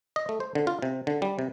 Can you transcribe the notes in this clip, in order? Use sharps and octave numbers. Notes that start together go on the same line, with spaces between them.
D#5
A3
C5
D3
F4
C3
D3
G3
C3